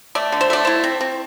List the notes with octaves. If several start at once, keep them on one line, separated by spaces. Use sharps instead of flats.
A3 D5
D3
C5
A3 D5
E4 C5
C4
C4